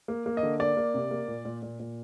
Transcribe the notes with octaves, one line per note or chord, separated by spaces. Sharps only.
A#3
A#3
D#5
D3
A#3 D5
A#3
C3
A#3
A#2
A#2
A#2
A#2